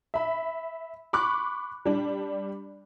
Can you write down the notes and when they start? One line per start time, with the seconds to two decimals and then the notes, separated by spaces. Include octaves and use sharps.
0.14 E5 B5
1.13 B5 C#6 D6 F#6
1.85 G3 D4